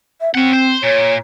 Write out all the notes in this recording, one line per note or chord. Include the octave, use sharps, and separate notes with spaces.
E5
C4 C#4 F#5
C5
A#2 C#5